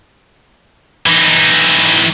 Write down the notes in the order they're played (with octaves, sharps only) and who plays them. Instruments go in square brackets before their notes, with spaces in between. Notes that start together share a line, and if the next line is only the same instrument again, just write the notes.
[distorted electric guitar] E3 D#4